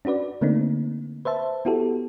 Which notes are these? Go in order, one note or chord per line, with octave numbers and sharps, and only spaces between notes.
C#4 D4 F#4 B4 D5
D3 A3 A#3 C4 D4 D#4
B4 C5 E5 A5
B3 E4 F#4 G4 A4